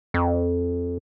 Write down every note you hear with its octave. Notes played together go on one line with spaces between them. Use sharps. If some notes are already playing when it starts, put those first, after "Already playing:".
F2